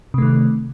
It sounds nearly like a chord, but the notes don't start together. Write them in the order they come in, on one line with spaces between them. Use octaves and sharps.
C3 A3 D#3